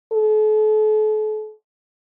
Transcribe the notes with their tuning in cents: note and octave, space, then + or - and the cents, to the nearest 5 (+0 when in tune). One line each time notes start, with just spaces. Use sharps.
A4 -40